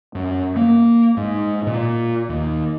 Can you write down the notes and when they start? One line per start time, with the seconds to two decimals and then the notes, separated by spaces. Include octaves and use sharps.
0.15 F#2
0.56 A#3
1.17 G#2
1.67 A#2
2.29 D#2